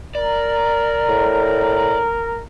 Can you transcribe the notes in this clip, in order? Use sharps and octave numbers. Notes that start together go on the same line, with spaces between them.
A#4 D5 A#5
A2